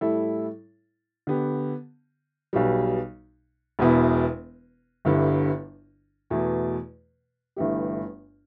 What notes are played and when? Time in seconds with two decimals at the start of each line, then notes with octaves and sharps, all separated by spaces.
0.01 A2 G3 E4 A4 E5
1.27 D3 B3 G4
2.53 B1 B2 G3
3.79 E1 E2 B2 B3 E4
5.05 G1 G2 D3 G3 E4
6.30 E2 B2 A3
7.57 G1 G2 E3 A3 G4